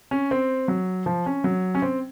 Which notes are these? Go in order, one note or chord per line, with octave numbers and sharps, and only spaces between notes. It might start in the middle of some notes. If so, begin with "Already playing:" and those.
C#4
C4
F#3
F3
C#4
F#3
C#4
C4